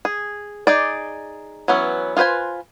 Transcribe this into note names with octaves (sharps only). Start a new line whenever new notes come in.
G#4
D#4 G#4 D5
E3 F#3 B3 C#4
F4 G#4 B4 C5 G#5